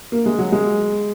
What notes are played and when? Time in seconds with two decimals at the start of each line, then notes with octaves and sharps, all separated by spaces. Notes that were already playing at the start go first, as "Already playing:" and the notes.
0.12 A#3
0.26 G#3
0.39 F#3
0.52 G#3